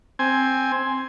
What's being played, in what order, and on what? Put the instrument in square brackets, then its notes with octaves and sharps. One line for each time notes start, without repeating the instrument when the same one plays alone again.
[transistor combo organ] C4 G#5